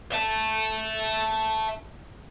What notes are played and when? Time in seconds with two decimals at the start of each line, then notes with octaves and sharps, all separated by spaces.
0.12 E5 A5